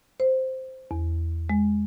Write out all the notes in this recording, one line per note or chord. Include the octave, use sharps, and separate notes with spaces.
C5
E2
G#3